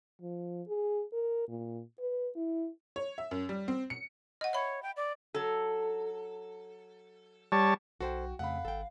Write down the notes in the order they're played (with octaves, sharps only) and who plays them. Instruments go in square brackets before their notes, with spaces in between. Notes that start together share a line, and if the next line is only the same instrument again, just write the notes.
[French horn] F3
G#4
A#4
A#2
B4
E4
[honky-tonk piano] C#5
E5
F#2
G3
C4
C#7
[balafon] D#5 F#5
[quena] C#5 [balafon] E5 B5
[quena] G5
D5
[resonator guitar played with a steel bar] F#3 A4
[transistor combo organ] G3 C#5 A5
[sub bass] B1 [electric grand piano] F#4 G5 [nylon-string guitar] A4 C5
[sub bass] F2 [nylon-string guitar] C#3 A3 [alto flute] F5 [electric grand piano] F#5 B5
[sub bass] G#1 [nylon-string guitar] A4 G5